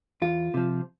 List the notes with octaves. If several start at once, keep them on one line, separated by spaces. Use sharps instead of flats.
E2 F4
C3 F3